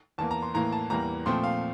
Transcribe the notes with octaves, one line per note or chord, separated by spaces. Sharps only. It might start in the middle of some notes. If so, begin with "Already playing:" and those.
E2 E3 A#3 A5
A#5
C6
A2 E3 A#3 A#5
A5
E2 E3 G3 A#3 A#5
A#2 F3 A3 C4 C6
F5